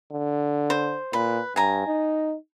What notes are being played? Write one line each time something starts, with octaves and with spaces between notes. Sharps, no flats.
D3
C5
A#2 B4
G2 G#5 A#5
D#4